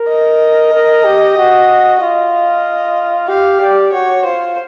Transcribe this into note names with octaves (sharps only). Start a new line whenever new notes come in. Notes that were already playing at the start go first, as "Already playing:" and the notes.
Already playing: A#4
D#5
A#4
G4
F#4
F4 D#5
G4 F5
G4 D5
F#4 C#5
F4 C5